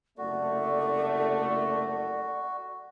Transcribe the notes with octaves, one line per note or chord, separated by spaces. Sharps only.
F#1 C2 A3 F#4 D5